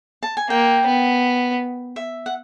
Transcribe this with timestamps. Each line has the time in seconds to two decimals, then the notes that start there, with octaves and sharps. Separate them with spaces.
0.23 A5
0.37 G#5
0.50 A#3 G5
0.87 B3
1.96 E5
2.26 F#5